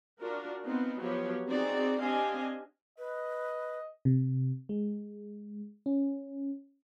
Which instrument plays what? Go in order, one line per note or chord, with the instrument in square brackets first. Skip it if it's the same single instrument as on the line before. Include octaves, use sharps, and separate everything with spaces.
[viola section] D4 F4 F#4 A#4
B3 C4 D#4 F4
F3 F#3 B3 G4 C#5
C4 D#4 F#4 G#4 D5
C4 D4 G4 D#5 F5 G#5
[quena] B4 [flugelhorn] D#5
[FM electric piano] C3
G#3
C#4